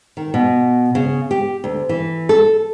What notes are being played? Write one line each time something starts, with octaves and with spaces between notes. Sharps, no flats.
D#3
B2
C#3
G4
D2
E3
A4